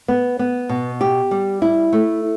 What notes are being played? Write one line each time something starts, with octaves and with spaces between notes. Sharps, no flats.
B3
B3
B2
G4
G3
E4
A3